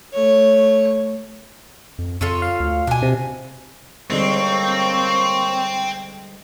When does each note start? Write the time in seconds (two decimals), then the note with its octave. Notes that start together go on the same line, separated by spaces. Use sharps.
0.13 A3 C#5
1.98 F2
2.21 F2 F4 A4 C#5
2.42 F5
2.60 D2
2.87 B2 D4 G#5
3.02 C3
4.10 G#2 D3 G3 A#3 C4 C#5 C#6